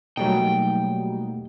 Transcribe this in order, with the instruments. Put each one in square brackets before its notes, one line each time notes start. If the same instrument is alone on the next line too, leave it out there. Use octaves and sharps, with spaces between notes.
[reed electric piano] B2 A3 A#3 [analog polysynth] F#3 G3 D#4 [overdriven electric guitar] G5